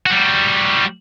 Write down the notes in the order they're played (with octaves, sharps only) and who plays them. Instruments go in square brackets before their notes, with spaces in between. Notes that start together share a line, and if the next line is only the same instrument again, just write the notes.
[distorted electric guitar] G3 F#4